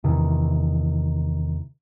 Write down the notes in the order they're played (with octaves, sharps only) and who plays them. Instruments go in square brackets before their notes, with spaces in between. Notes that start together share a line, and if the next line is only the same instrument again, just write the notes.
[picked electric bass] E2 C3 D#3 E3